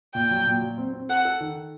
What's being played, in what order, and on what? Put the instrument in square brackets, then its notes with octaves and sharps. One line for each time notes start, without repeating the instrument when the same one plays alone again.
[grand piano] A#2 [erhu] G5
[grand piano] F#3
A#2
F#3
C4
C4
[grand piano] A4 [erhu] F#5
[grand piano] A4
D#3